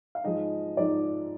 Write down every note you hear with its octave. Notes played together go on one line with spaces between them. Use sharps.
F5
G#2 F3 G#3 D#4 D#5
G#2 F3 G#3 D#4 D5